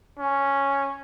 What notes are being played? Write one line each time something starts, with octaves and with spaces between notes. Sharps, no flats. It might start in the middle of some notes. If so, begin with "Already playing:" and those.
C#4